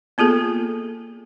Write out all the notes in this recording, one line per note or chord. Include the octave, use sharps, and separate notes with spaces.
A#3 B3 F4 G#4 A4